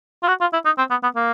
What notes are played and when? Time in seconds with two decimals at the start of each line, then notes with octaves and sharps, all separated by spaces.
0.23 F4
0.28 F#4
0.41 F4
0.53 E4
0.66 D#4
0.78 C4
0.91 B3
1.03 B3
1.16 A#3